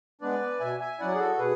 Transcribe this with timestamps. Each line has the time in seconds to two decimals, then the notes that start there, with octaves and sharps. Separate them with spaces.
0.21 G#3 B3 D4 B4 D5
0.60 B2 E5 G#5
0.80 E5 G#5
1.00 F#3 C#4 E4 D5 F#5
1.14 G#4
1.19 F#4 A4
1.38 B2 G#4 B4